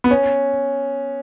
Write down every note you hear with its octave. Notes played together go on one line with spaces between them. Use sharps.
B3
C#4